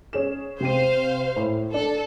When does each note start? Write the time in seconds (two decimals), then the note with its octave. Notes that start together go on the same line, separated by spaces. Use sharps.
0.13 C#4 G#4 E7
0.60 C3 C5 F5 G5 D#7
1.36 A2
1.74 D4 A4